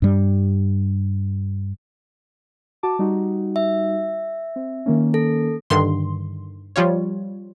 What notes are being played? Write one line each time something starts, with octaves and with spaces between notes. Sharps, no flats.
G2 G3
F#4 A5 D6
G3 D#4 F#4
E5
C4
D#3 A#3 C#4
A4
G2 D3 D#3 C6
F3 G3 F4 C#5